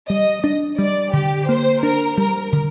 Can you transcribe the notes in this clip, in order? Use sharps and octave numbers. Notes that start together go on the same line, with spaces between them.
G3 D#5
D4
G3 D5
D3 G4
A#3 C5
D4 A#4
G3 A#4
D3